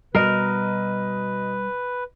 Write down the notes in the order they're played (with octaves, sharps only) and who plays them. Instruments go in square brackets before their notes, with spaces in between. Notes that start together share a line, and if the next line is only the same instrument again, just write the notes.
[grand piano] B2 D#5 [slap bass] G3 [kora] A#4 [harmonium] B4